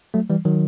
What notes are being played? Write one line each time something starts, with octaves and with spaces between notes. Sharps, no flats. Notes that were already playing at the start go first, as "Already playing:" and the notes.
F#3 A3
E3 G3
D#3 F#3